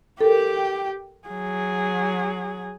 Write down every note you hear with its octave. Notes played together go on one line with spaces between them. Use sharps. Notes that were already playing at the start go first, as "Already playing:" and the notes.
G4 A4 A#4 G5
F#3 G#4